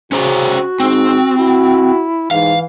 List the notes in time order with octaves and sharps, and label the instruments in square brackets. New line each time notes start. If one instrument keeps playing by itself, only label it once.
[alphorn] C#3 [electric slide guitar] C#4 C5 A#5 [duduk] F#4
[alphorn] G#2 [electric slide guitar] C4
[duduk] E4 [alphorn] F#4
[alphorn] G#2 [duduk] E3 [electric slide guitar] F5